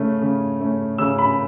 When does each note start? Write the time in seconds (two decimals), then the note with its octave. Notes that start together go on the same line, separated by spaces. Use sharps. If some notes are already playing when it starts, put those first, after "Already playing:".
Already playing: C#3 A3 C#4
0.22 C#3
0.60 A3 C#4
0.98 C#3 E6
1.18 B5